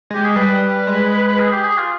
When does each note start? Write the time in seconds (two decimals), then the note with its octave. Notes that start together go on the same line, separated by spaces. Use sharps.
0.10 G#3 G4
0.25 G#4
0.36 G3 B4
0.87 G#3
1.39 G#4
1.52 G4
1.64 G#4
1.78 F4